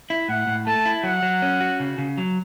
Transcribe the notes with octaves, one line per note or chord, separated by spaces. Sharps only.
E4
A2 F#5
A2
A3 A5
E4
F#3 F#5
F#3
C#4
F#4
C#3
C#3
F#3